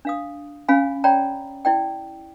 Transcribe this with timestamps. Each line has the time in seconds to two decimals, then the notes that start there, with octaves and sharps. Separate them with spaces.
0.05 D4 F5 D#6
0.68 C#4 F5 G#5 B5
1.04 C#5 D5 G5 A#5 B5
1.65 E4 D5 G5